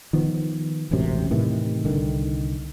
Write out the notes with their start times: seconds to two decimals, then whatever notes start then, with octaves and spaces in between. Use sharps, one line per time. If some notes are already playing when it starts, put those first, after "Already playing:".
0.13 D#3 F3 B3
0.91 E1 A1 F#2 C3
1.31 A2 C3 D#3 E3
1.84 C2 D3 D#3